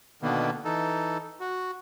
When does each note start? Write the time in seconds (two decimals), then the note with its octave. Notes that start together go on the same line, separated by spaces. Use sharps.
0.22 B2 D3 D#3 A#3 B3
0.65 E3 D#4 A4
1.40 F#4